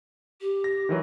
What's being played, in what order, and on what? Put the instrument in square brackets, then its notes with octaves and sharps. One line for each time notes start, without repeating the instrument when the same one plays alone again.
[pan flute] G4
[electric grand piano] A#6
D#3 E3 F#3